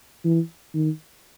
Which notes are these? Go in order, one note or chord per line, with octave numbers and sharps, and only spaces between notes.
E3
D#3